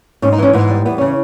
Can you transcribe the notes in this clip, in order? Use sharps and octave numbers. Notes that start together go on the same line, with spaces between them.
G#2 C#4
D#4
E3 C#4
G#2 B3
G3
E2 B3
C#3 C#4